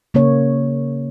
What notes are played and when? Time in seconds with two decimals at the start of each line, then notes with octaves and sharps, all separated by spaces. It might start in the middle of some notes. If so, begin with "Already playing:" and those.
0.14 C#3 A#3 C#4 C#5